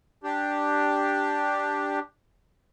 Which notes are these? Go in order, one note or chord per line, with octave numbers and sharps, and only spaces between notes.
D4 G4